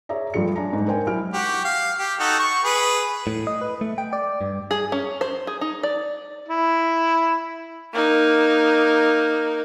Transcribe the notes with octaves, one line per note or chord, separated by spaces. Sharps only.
G#4 C#5 D5 E5 A#5
G2 F3 A3 C#7
D4 G#5 A#5
G#2 D4
A#4 C5 G5 G#5
F#3 E4 F6 D7
F#4 G4
F5
G4
D#4 F#4 A4
C#6
G#4 B4
A2
D#5
B4
A3
G5
D5
G2
G#4
C#4
C5
G#4
D#4
D5
E4
A#3 D#4